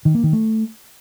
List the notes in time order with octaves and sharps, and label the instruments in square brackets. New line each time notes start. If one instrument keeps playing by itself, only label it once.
[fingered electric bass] D#3
A#3
D#3
A3